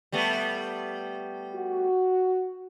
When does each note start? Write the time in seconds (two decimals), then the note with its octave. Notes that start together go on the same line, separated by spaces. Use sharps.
0.12 G3 A3 B3
1.55 F#4